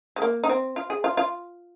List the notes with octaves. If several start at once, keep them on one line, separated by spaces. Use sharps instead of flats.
G#3
A#3
D#4
C4
F4
G#4
F4
F4